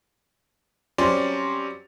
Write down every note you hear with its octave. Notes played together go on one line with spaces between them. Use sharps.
F#3 G3 C4 C#4 D5 C6